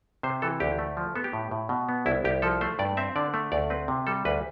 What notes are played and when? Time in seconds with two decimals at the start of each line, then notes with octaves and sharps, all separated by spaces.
0.23 C3 C5
0.42 E3 A4
0.60 D2 G4
0.79 A3
0.97 F3
1.16 B3 A4
1.24 G4
1.33 A2
1.51 A2
1.69 B2
1.89 B3
2.06 C2 E4
2.24 C2 G4
2.42 F3 A4
2.61 A3 C5
2.79 G2 D5
2.97 C4 E5
3.16 D3 D5
3.34 A3
3.52 D2 D5
3.70 C4 B4
3.88 C3
4.07 G3 A4
4.25 D2 B4